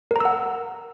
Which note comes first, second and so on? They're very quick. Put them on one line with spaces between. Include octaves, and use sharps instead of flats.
A#4 A#5 E6 F#5